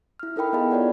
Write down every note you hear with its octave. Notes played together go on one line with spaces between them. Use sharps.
E4 F6
D#4 A4 A#4 G5 B5
B3 E4 G#4 D#5 A5 B5
F4 C#5 D5 F#5